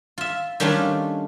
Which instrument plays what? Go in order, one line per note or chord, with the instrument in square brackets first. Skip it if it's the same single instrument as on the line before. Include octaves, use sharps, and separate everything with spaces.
[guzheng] F4 E5
D#3 G3 A3 C#4 D4 F4